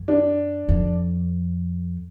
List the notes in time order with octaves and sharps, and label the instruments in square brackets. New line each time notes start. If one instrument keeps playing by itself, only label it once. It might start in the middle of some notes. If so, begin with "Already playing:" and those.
Already playing: [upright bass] F#2
[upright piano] D4
[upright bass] F2